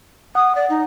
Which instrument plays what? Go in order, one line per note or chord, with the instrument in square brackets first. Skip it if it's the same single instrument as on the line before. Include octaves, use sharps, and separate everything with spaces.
[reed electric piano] F#5 [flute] D#6
[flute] D5
D#4